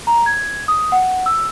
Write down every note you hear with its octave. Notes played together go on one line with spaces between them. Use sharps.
A#5
G#6
D#6
F#5
E6